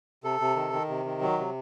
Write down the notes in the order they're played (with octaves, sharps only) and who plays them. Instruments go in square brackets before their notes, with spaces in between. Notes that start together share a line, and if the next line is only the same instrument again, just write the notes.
[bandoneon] C3 A4
C3
D#3
D#3
C3
D#3
F#3
C3